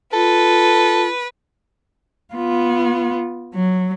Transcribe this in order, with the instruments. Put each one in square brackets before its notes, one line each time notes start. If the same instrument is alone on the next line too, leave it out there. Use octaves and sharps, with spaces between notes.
[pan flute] F4 [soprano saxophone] A4 [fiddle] B4
[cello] B3 F4
F#3